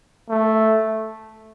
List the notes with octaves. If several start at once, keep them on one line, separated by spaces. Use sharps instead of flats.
A3